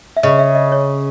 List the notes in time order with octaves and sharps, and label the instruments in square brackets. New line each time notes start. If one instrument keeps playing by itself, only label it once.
[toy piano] E5
[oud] C#3 [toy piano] D#5
[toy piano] E5
D#5
C#5